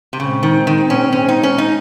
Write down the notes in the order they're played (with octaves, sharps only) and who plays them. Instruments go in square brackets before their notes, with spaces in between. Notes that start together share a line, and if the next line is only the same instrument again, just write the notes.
[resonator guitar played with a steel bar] C3
[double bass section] A#2 G#3 C4 [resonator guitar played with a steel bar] C#3
[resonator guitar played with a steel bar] D#3
D#3
C#4
C#4
D#4
C#4
D#4